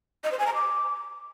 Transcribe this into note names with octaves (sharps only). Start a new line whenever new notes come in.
D#5
C5
G#5
A#5
D6